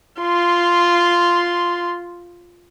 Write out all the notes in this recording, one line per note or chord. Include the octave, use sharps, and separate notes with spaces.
F4 C6